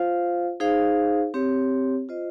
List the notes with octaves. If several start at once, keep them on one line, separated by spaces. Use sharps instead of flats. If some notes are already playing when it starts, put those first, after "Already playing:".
Already playing: F4 C5 F5
D#4 G#4 C5 F5
C4 G4 C#5
F4 C5 D#5